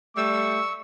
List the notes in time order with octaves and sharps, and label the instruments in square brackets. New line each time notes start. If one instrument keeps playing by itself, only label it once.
[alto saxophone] G3 [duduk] A3 [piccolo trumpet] C#6 [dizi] E6